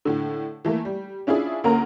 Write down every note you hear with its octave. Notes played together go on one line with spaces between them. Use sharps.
A2 D3
E3 A3 A#3
G3
C#4 D4 E4 F4 G#4
D2 A#3 C#4 A#4 A#5